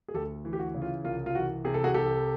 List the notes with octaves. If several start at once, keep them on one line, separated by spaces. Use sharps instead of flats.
G#4
D2 G4 A4
E3
G4
F#4
C#3
F4
C2 F4
F4
E3 F#4
C3 G#4
A4
F#4 G#4
C2 G4 A4